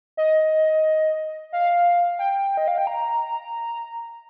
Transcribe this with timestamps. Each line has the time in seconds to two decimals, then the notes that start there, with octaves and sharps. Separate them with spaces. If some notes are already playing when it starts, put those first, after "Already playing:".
0.17 D#5
1.53 F5
2.19 G5
2.57 D#5
2.68 F5
2.78 G5
2.87 A#5